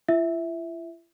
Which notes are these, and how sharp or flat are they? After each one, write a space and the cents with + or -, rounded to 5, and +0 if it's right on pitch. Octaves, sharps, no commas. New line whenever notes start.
E4 +45 E5 -5